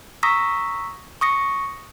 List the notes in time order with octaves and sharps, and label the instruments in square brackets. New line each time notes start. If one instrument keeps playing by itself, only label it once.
[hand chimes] A#5 C#6 D#6 E6 A#6 B6
C#6 D#6 A#6 C#7